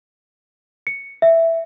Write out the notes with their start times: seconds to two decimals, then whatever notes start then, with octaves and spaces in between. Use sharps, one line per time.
0.87 C#7
1.22 E5